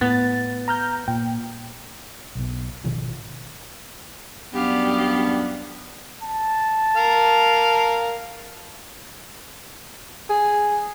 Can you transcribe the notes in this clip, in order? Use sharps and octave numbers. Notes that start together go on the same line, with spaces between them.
A2 B3 A6
A#5 F6 G6
A#2 G5
B1 B2
G#1 B2 D#3 F3
F#2 G3 B3 D4 G4 F5
A5
A#4 F5
G#4